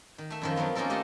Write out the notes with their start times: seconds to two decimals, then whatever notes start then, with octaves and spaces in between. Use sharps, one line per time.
0.18 D#3
0.30 A3 E5
0.42 F#2 D#3 F3
0.56 F3 F#3 B3 C4
0.75 A#3 C#4 D#4 F4 A4 A#4
0.90 A3 G4 D#5 F#5 A5 C6